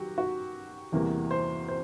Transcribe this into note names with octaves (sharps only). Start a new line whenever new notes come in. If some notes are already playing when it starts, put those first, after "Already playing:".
Already playing: D#3 F#3 F#4 G4
F#4
E2 C3 E3 G3 A#3
C5
C5